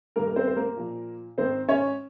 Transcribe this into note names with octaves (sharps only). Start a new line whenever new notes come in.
G2 D#3 A#3 A#4
A#4
C4 C5
C5
A#3 A#4
A#2 F3
G#2 D#3 C4 C5
C#4 C#5